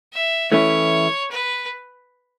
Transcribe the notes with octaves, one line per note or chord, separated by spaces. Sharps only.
E5
E3 A3 C#4 E4 C#5
B4